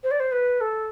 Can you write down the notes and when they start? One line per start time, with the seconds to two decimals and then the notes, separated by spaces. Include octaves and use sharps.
0.04 C5
0.11 D5
0.20 C5
0.32 B4
0.61 A4